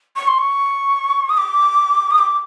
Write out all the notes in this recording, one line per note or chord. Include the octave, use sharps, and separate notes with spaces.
C#6
C6
C#6
D#6
D6
D#6
D6